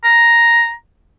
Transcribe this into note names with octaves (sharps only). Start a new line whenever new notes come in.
A#5